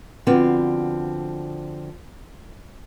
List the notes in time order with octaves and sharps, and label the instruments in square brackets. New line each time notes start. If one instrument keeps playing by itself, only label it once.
[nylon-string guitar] D3 F3 B3 C4 F#4 B4